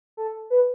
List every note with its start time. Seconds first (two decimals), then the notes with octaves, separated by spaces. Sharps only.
0.17 A4
0.50 B4